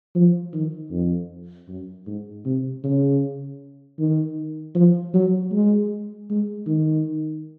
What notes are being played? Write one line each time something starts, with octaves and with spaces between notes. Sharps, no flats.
F3
D#3
F2
F#2
G#2
C3
C#3
D#3
F3
F#3
G#3
G#3
D#3